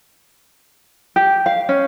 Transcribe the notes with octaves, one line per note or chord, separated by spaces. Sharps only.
G4
F5
C#4